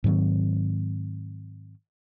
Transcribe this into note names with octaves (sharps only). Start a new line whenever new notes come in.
G#2 D#3 F#3 C4